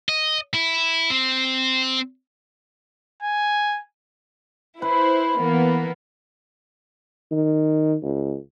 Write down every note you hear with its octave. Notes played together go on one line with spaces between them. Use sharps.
D#5
E4
C4
G#5
E4 B4 C5
E3 A#3 B3
D#3
C#2